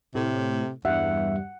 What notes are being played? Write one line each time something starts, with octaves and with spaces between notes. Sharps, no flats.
A2 C3
E2 G2 E5 F#5